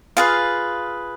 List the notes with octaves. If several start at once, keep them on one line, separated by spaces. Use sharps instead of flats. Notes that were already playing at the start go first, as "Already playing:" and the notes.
F4 G#4 B4 F5